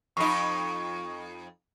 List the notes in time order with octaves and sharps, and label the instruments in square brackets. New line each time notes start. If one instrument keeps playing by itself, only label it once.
[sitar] F2 D#4 [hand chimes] C#6